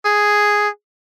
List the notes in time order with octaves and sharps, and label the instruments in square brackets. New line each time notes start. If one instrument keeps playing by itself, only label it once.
[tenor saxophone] G#4